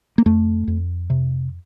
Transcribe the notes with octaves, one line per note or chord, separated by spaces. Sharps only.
A#3
F2 A3
F2
C3